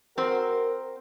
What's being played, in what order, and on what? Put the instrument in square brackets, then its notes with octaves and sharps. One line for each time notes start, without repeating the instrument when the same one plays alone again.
[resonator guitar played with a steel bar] C4 C5 [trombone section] F#4 A#4